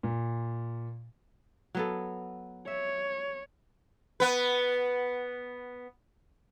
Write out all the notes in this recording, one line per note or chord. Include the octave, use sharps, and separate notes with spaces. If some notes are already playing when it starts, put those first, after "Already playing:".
A#2
F#3 B3 A4
C#5 E5
B3 B4